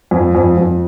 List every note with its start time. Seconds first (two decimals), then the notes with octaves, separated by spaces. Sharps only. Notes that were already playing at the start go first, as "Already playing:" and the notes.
0.11 F2
0.35 F2
0.57 F2